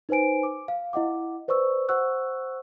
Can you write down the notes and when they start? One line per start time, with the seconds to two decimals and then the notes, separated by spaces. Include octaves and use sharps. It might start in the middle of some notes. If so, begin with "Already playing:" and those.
0.09 D#4 B4 C5 G#5 D7
0.43 D6
0.68 F5
0.93 E4 D#5 F#5 D6
1.48 B4 C5 D5 C#6 E6
1.89 C5 F#5 C#6 E6 F#6